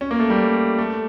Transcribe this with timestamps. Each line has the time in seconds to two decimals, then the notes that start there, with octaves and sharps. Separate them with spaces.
0.01 C#4
0.11 A#3
0.20 A3
0.30 G3
0.78 A3